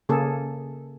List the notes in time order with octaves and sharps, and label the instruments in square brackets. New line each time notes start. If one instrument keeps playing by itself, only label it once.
[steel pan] C#3 A#3 G#4 A4